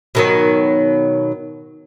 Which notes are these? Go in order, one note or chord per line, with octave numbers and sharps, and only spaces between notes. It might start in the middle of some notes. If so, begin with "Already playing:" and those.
B2 D#3 F#3